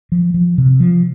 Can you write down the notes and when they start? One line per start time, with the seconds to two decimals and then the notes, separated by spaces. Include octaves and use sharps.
0.12 F3
0.34 F3
0.58 C3
0.80 F3